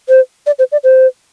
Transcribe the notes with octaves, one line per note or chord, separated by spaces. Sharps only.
C5
D5
C5
D5
C5